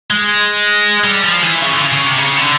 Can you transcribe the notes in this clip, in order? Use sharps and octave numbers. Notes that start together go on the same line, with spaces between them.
G#3
G3
F3
E3
C#3
D3
C#3
C#3
C3
C#3
D3